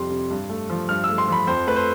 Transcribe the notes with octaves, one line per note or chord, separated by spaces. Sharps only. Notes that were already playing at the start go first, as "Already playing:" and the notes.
Already playing: F2 C3 G3 C6
C3
G2
A3
F3
G2 F6
E6
A3
C6
F3 B5
F2 C5
A3 B4
C5